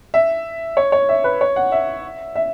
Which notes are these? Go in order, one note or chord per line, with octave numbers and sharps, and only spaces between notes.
E5
C#5
C#5
E5
B4
C#5
F#5
E5
E5